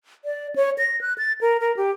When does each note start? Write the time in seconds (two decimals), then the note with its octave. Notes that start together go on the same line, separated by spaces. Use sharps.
0.25 D5
0.56 C#5
0.78 A#6
1.01 F#6
1.18 A6
1.41 A#4
1.60 A#4
1.77 G4